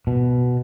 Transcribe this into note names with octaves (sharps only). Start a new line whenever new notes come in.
B2